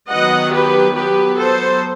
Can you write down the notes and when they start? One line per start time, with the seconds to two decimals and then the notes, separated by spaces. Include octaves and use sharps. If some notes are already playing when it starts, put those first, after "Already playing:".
0.10 D#3 F#3 B3 D#5 F#5
0.53 G4 B4
0.95 F#3 B3 G4 B4
1.38 A4 C5